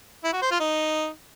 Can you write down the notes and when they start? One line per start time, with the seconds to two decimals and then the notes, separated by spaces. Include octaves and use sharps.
0.24 E4
0.33 F#4
0.42 C5
0.51 F4
0.60 D#4